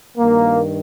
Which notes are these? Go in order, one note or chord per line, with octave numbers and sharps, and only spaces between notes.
G2 D#3 A#3